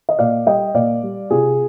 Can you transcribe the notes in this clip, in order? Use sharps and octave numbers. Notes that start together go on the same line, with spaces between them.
D#5
A#2 D5 F5
G3 D#5 G5
A#2 D5 F5
G3
C3 F4 G#4